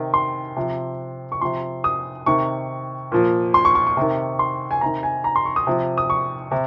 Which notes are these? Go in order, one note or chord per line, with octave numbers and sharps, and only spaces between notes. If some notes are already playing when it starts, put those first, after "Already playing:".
Already playing: C3 D#3
C6
C3 F3
C#6
C3 F3 C6
D#6
C3 D#3 C#6
A#2 F3
C6
C#6
C#6
C#6
C3 D#3
C6
G#5
C3 D#3 A#5
G#5
A#5
C6
C#6
D#6
C3 F3
D#6
C#6
C3